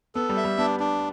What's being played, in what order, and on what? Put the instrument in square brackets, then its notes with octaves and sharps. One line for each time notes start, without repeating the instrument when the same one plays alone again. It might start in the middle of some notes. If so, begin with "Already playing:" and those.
[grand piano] B3 [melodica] A4
[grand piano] G3
[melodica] E5
[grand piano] G3
[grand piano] B3 [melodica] D4
[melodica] D4